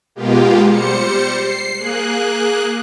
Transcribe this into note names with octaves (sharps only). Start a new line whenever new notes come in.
B2 G#3 A#3 B3 F4 G4
G3 C5 C#7
C7
A#3 G#4 F#6